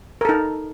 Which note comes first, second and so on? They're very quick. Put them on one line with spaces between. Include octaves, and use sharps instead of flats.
A#4 A4 D#4